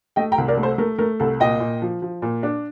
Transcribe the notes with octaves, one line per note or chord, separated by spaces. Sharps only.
A3 D#5 G5
G5 A#5
C2
A#4 D5
A3
A4 C5
A3 A#4
A3 A#4
C2 A4
A#2 D#5 G5
A#2
F3
F3
A#2
D4